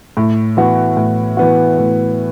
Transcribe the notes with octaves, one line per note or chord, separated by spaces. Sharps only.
A2
E3 B3 F#4
A2
E3 B3 F#4
A2